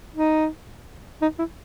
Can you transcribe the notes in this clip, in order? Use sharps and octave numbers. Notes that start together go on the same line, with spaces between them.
D#4
D#4
E4